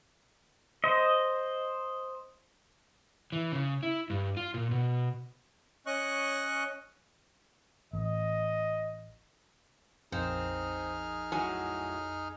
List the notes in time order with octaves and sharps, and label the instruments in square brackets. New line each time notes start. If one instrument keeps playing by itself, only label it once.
[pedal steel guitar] C5 D#5
[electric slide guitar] E3
C#3
E4
G2
F4
A#2
B2
[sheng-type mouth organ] C#4 D#5 C#6 F#6
[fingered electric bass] A1 [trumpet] D#5
[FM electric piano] A#1 F2 [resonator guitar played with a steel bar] C4 [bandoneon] D#4 G#4 F6
[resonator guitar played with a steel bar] A2 F#3 G#5